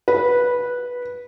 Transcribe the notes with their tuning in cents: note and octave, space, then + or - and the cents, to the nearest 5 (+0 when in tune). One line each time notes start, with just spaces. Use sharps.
B4 -10